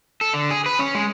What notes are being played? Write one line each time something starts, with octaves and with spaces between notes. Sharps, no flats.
A4
D3
G#4
B4
C#4
G#3